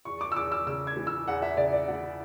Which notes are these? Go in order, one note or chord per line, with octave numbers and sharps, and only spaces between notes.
E2 C#6
D6
E6
E2 D6
E6
C#3 E6
G#6
E3
E6
E2 F#5
E5
C#3 D5
D5
E3 F#5